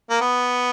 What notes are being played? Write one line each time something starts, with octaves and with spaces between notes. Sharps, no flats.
A#3
B3